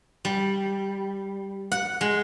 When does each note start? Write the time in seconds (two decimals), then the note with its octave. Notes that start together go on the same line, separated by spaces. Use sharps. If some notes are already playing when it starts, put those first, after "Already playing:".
0.25 G3
1.72 F#5
2.01 G#3